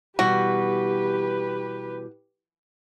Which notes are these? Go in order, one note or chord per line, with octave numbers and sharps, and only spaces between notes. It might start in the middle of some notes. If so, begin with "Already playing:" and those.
B2 E3 G3 F#4 G4 B4